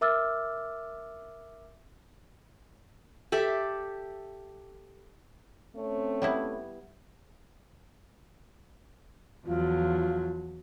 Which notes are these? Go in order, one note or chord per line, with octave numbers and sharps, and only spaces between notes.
A#4 E5 D6 E6 F6 A6
G4 A4 D5 E5
A3 C4 C#4 C#5
G3 B3 E4
E2 F3 F#3 F4